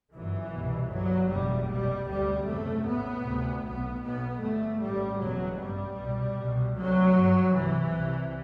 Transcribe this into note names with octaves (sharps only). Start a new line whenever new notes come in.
G1 F#2 E3
C2 B2
G1 G2 F#3
F#1 E2 B2 G3
C2 B2 G3
D2 C3 G3
F#1 E2 C3 A3
A1 A2 B3
D2 C3
B1 A2 B3
B1 B2 B3
G1 G2 A3
A1 A2 G3
F#1 E2 B2 F#3
A1 G2 G3
C2 B2
C2 B2
D2 C3 F#3
G1 G2
C2 C3 E3
C2 C3